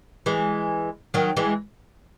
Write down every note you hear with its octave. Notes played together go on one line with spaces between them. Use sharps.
E3 G#3
D#3 F#3
E3 G#3